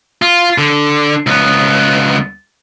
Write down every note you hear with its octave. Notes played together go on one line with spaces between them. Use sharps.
F4
D3
C#2 B3